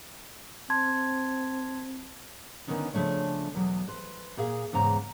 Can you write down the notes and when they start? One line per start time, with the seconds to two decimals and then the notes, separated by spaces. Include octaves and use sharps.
0.70 C4 A5 C6 G#6
2.67 D3 D#3 B3 C#4 D#4 B4
2.94 C#3 F3 A3 D4 C#5
3.54 E2 B2 F#3
3.88 B4 C5
4.37 A#2 G#4 F5
4.73 E2 G#2 C#3 A#5